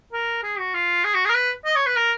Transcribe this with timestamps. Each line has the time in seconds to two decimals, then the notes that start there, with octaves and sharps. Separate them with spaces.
0.13 A#4
0.43 G#4
0.59 F#4
0.74 F4
1.04 G#4
1.15 F#4
1.25 G#4
1.30 A#4
1.35 B4
1.66 D#5
1.76 C#5
1.87 B4
1.96 A#4